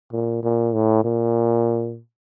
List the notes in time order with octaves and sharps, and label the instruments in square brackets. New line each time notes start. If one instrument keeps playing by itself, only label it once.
[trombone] A#2
A#2
A2
A#2